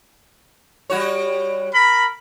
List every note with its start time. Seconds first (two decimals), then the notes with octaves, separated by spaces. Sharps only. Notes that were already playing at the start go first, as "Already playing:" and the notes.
0.90 G3 F#4 C#5
1.74 A#4 B5